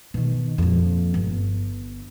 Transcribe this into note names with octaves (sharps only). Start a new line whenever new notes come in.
B2 D#3
F2 A#2
G1